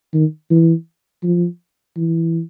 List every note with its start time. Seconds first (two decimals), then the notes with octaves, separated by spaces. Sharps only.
0.14 D#3
0.51 E3
1.23 F3
1.97 E3